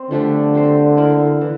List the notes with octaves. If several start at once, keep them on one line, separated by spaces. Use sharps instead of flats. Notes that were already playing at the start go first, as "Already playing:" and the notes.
Already playing: C4
D3 F3 A3 D4 G4
C4 G4 C5
A#3 E4 A#4
E3